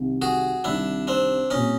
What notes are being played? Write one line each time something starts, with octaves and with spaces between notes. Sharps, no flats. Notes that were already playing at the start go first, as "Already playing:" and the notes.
Already playing: C2 C3 D#3 G3
F#4 G#4
C2 C3 D#3 G3 D4 E4
C4 D4
A#2 G3 C4 C#4 D#4